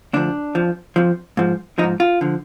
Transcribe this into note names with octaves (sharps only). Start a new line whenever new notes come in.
D2 D3 F3 D4
F2 F3
F2 F3
G#2 F3
F3 D#4
G#2
F4
D3 F3